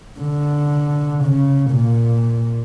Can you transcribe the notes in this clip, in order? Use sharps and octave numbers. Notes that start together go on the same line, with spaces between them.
D3
C#3
A#2